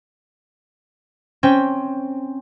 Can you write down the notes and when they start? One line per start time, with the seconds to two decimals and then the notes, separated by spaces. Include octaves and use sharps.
1.43 C4 C#4 G5